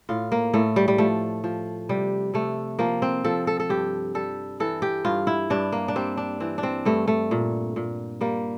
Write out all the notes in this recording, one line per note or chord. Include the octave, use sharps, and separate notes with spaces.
A2 F4
A#3
A2 A3
G3
G3
F3 A3
F3
C3 G3
C3 A3
F3 A#3
C4
F3 A4
A4
A4
G2 G4
G3 A4
E3 A4
G4
G2 F4
E4
G2 D4
A#3
D4
G3 C4
D4
E3 C4
D4
C4
G2 A3
A3
A#2
A#2
G3 A#3